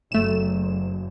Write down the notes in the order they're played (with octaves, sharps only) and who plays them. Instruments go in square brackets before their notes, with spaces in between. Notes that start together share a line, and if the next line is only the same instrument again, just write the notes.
[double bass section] F#1 [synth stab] A3 E7